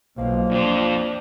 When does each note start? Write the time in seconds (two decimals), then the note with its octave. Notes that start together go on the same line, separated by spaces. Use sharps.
0.17 B1 F3 A#3
0.51 F2 D4 C5